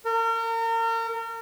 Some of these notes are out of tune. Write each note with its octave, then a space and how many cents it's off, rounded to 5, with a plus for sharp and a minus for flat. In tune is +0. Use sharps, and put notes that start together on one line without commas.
A#4 -35